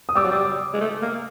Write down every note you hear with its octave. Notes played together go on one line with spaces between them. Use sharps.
D#6
G3 D6 E6
F#3
G3
G#3
A3
A#3